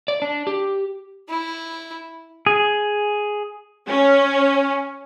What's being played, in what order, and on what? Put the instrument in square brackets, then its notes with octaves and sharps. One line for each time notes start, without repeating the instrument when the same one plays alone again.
[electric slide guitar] D5
D4
G4
[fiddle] E4
[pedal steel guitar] G#4
[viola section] C#4